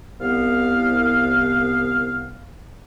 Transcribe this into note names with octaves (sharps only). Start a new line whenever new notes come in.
C2 B3 F5